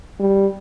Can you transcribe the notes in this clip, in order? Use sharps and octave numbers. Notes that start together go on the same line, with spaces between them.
G3